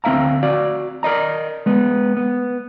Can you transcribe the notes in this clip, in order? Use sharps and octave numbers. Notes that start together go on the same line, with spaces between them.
D2 C4 D4 E5 F5 A#5
F#4 D5 F5
A#4 D5 D#5 A#5
G#3 B3
B3